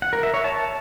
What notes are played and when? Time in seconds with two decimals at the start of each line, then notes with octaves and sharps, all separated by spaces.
0.02 F#5
0.13 A#4
0.23 E5
0.34 C#5
0.44 A5